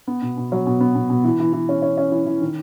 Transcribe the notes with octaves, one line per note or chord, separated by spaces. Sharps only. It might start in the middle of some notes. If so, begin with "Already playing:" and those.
B3
B2
B2
F#3
B2
B3
B2
B2
E3
E3
E3
C#4
C#4
C#4
E3
E3
D#3